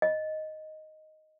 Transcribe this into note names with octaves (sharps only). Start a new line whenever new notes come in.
D#5